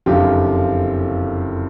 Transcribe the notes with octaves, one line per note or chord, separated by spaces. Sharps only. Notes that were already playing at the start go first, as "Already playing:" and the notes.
F#1 F2 D3 F3 F4 G4